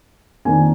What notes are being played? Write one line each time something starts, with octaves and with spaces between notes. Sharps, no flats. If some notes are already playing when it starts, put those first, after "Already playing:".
F2 D#3 A#3 D4 G#5